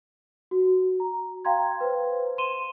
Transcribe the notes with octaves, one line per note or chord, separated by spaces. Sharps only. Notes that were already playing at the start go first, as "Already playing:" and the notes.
F#4
A#5
F5 G5 A#5 C6 G#6
B4 C5
C6 D#7 E7 G7